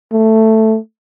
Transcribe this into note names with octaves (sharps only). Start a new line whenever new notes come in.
A3